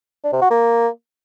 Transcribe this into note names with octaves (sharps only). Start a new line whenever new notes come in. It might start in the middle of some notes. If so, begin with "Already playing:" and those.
D4
C3
F#4
A#3